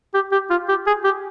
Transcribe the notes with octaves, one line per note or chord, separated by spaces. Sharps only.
G4
G4
F4
G4
G#4
G4